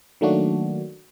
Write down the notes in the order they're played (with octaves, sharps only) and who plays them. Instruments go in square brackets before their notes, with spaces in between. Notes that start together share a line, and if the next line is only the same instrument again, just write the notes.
[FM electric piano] D#3 F#3 A3 A#3 D4 F#4